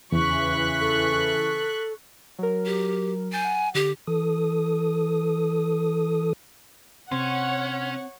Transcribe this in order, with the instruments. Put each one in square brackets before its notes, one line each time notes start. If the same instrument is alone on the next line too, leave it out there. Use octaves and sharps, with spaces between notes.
[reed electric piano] E2 [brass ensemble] C#3 E3 [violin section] C#6 F#6 B6
[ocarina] A4
[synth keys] F#3 A#4
[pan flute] G4
[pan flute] G#5 [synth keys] G6 A6 C7
[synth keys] F#5
[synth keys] D3 [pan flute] G4
[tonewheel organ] E3 A4 D#6
[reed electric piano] C3 C6 [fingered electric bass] C4 [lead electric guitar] C#4 [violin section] C#5 F#5